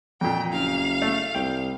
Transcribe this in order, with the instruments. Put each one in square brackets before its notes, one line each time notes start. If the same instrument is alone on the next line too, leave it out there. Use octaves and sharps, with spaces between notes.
[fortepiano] F2 A#2 [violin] G5
[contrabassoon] F#1 [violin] F5
[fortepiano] A3
[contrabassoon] C2 [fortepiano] G5